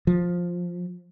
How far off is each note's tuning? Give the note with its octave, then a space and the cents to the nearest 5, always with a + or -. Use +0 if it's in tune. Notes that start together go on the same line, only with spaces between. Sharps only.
F3 +10